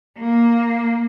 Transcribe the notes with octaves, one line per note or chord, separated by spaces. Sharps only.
A#3